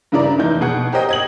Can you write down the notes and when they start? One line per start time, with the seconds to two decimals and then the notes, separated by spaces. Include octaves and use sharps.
0.12 G2 C#3 E4 A#4 D5
0.39 F1 E3 D#4 G6
0.61 B2 G#4 F#5
0.92 G4 A#4 C5 D#5 G5
1.09 D#5 G#6 F#7